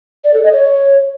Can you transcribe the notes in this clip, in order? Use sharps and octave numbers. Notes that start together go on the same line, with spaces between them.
D5
A4
D#5
C#5